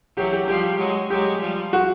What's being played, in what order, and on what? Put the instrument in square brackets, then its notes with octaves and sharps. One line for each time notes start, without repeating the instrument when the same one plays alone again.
[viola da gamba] E3 F#3 [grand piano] G4
[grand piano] G4
[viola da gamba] F3 G3 [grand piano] G4
[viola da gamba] F#3 G#3
[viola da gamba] F#3 G#3 [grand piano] G4
[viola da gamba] F3 G3
[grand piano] F#4